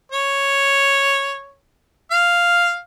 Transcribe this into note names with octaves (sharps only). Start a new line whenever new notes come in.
C#5
F5